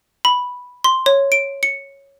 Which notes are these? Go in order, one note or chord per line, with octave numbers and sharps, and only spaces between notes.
B5
C6
C#5
D7
C#7